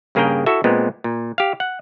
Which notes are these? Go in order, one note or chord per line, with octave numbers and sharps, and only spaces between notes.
G2 C#3 A#3 G#4 A#4 G5
E4 F#4 A4 E5
A#2 G#3 B3 C4
A#2
G4 F5
F#5